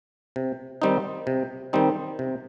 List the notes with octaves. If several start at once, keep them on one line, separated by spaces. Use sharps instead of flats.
C3
D#3 G3 C4 D#4
C3
D#3 G3 C4 D#4
C3